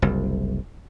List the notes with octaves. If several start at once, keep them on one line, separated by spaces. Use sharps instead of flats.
F#1 C2